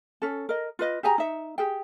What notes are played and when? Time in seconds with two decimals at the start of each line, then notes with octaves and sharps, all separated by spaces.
0.22 C#4 A4
0.49 A#4 D#5
0.79 F4 B4 D#5
1.03 G4 G#4 G#5 A#5
1.18 D#4 E5
1.58 G4 G#4 G5